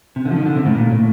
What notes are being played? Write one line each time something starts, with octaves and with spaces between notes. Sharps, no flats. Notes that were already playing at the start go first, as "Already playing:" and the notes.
C3
D3
F3
D#3
D3
C3
A2
A#2
A2